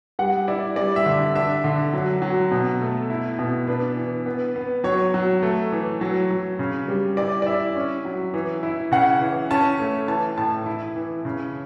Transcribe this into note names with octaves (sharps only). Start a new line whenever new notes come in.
G3 F#5
E4 D5
G3 D5
E5
D3
D4 E5
D3
F#3
F#3
B2
A3
E4
B2
D4 B4
E3
B3
B3
F#3 C#5
F#3
A3
E3
F#3
F#3
C#3
G3
E4 D5
D5
E4 E5
C#4
F#3
E3
E4
C#3 F#5
E3
C#4 A5
A3
E3 A5
A2 A5
E4
E3
C#3